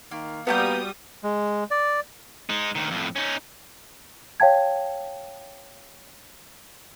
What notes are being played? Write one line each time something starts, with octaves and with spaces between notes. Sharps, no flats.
D#3 A#3
G3 A#3 B3 F#4 G4 D#6 G6
G#3
D5
G#3 D#4
D2 D#3
F2 A2
C#4 D#4
C#5 F5 G5 A5 G#6